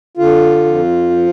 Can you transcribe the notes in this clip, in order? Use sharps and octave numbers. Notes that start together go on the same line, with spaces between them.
D3 F4
F2
F3